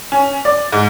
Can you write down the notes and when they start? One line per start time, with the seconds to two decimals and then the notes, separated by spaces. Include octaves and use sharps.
0.12 C#4
0.45 D5
0.72 G#2